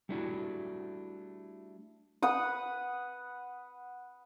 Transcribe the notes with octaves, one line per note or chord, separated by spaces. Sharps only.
G3 A3 D4 E4 F#4
B4 F#5 D#6